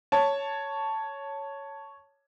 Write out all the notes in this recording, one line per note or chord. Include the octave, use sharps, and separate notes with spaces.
C#5 A5